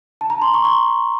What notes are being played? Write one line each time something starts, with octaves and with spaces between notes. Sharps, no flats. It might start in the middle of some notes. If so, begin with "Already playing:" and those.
A5
A#5
C6
C#6
C6